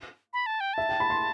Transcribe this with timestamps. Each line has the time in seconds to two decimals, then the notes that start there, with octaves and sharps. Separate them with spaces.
0.33 B5
0.46 A5
0.60 G5
0.74 E5 A5
0.89 G5
1.00 B5
1.10 C6